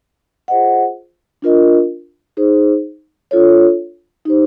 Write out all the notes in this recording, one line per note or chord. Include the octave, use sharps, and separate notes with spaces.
F4 G#4 C5 D#5 F#5
D4 F4 A#4 D#5
D#4 G#4 C5
D4 F4 A4 C#5
D#4 G4 C5